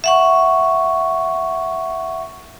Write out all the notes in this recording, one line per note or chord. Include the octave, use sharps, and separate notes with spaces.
E5 F#5 C#6